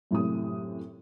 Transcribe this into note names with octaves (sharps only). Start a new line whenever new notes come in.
F#2 A2 C3 D#6